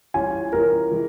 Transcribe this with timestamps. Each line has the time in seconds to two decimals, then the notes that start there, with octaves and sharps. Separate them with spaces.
0.14 E3 G3 C#4 F4 G#5
0.53 E3 G3 C#4 F4 A#4
0.92 E3 G#3